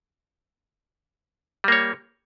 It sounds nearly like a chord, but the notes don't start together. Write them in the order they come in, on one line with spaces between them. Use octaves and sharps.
G3 A#3 C#5